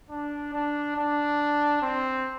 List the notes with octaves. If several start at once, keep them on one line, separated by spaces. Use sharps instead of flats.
D4
D4
D4
C4